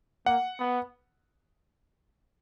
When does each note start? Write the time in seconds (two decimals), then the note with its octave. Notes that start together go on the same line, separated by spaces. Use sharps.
0.26 A#3 F#5
0.59 B3